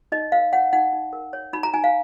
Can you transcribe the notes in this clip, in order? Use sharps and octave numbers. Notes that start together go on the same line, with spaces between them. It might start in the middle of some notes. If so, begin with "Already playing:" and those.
D#4 D#5
A#4 F5
C#5 F#5
D#4 F#5
D#4
A#4
C#5
D#4 B5
A#5
D#4 G#5
F5